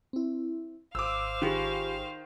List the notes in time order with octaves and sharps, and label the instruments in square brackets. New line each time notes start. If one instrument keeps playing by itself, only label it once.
[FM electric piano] C4 E4
[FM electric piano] G#1 [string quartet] C5 F5 [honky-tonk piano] D6 E6
[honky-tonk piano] D#3 [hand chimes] F4 G4 G#4